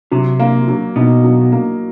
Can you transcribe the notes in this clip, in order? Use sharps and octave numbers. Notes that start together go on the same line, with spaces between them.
C3 F#3
A#3
F#3
B2 D#4
F#3
A#3